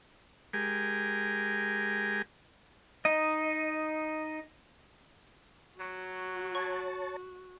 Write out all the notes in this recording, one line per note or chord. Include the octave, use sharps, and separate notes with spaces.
G#3 G4 A#4 G#5
D#4 D#5
F#3 F#4
C#5 A5 C#6 G#6